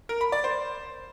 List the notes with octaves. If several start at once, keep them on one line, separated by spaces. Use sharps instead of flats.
A#4
B5
D5
C5